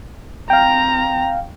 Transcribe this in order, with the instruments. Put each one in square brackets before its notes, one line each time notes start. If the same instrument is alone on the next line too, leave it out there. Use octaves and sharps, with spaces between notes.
[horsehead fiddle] C4 A#5 [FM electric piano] F5 G5